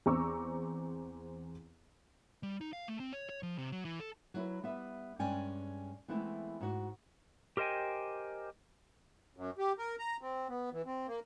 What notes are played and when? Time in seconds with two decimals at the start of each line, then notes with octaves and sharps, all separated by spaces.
0.06 E2 C4 A#5 C#6 D6 E6
2.43 G3
2.61 D#4
2.73 F5
2.88 A3
3.00 C4
3.13 C#5
3.29 C#5
3.43 F3
3.58 C3
3.72 F#3
3.85 E3
4.00 A4
4.34 F#3 E4 B4
4.63 G3 B3 B4 E5
5.19 G2 G#3 C#4 D5 G5 G#5
6.08 E3 G#3 A3 B3 C4 E4
6.61 G#2 F#4
7.57 G4 A#4 C5 D#5 G5 G#5
9.37 F#2
9.58 G4
9.78 A#4
9.99 A#5
10.21 C4
10.49 B3
10.73 E3
10.86 C4
11.07 A#3